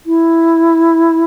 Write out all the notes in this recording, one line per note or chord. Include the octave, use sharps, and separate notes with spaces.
E4